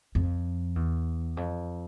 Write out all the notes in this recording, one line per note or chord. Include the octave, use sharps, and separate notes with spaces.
F2
E2
F2